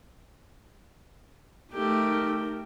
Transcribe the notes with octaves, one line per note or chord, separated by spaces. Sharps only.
A3 D#4 G4 A#4